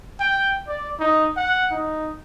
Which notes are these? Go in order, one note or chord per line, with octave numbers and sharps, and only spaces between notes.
G5
D5
D#4
F#5
D#4